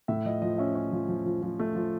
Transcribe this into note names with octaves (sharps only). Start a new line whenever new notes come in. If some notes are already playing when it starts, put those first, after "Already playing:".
A2 E5
F3 D#5
F3 D#5
C#4 E5
C#4
F3
F3
F3
F3
A3
F3